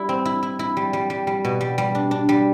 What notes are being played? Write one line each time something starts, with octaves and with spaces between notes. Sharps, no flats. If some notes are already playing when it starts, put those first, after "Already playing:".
Already playing: G3 E4
C4
E4
E4
E4
G3
G3
G3
G3
B2
G3
G3
D4
D4
G3